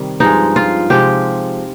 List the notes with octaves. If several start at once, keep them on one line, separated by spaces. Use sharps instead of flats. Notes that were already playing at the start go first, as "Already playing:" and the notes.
Already playing: C3 D#3 G3
G2 F3 G#3 D#4
F4
C3 F3 G#3 G4